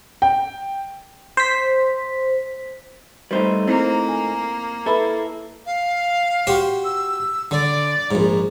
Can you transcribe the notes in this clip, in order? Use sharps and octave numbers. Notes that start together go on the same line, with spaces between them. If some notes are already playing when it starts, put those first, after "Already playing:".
G5
C5 B6
G3 A3 D#4 B4 C5
A#3 C4 E4
G#5
E4 A4 B4 B5
F5
F#4 G4 C5
E6
D3 D5
A#1 G#2